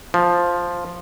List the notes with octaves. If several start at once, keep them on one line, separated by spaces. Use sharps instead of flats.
F3